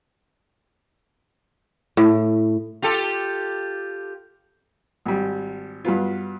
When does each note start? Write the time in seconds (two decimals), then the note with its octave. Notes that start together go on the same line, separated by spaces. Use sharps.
1.97 A2
2.82 F4 G4 A4
5.06 G#1 G3
5.85 G2 F#3 B3 F4